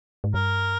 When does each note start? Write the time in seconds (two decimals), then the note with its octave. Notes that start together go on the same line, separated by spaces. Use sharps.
0.24 G#2
0.34 G2 A#4